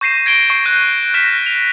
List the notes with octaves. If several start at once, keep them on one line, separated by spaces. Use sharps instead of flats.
C#6 G6 A#6 C7 D#7 E7
G#6 A#6 C7 D7 D#7 G7
C#6 C7 D7
F#6 G6 A#6 D#7
F6 F#6 A#6 B6 E7
F7